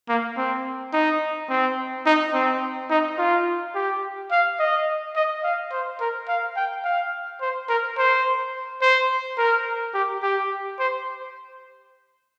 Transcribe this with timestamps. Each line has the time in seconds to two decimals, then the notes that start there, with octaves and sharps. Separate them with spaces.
0.09 A#3
0.37 C4
0.93 D#4
1.50 C4
2.06 D#4
2.34 C4
2.90 D#4
3.18 F4
3.75 G4
4.31 F5
4.60 D#5
5.16 D#5
5.43 F5
5.72 C5
6.01 A#4
6.28 F5
6.56 G5
6.84 F5
7.41 C5
7.69 A#4
7.98 C5
8.82 C5
9.38 A#4
9.94 G4
10.23 G4
10.79 C5